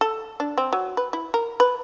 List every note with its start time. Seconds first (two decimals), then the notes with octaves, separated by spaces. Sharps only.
0.01 A4
0.40 D4
0.58 C4
0.73 F#3
0.97 B4
1.13 E4
1.34 A#4
1.60 B4